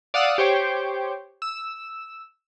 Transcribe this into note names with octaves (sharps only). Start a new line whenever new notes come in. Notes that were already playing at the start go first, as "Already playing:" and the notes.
D5 F5 F#5 D#6 E6 F#6
G4 C5 C#5 G5
E6